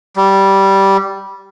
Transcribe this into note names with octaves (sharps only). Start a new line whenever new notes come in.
G3